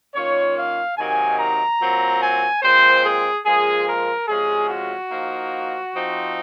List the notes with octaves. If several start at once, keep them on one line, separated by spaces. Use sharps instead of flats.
D#3 A#3 C#4 F4 C#5
F5
C3 D#3 F#3 A#3 D#4 G#5
A#5
A#2 F#3 C4
G#5
A#2 G#3 C4 C5
G#4
A#2 F3 G#3 G#4
A#4
C3 F3 G#3 C#4 F4 G#4
F#4
F3 A#3 D#4
F3 C4 D#4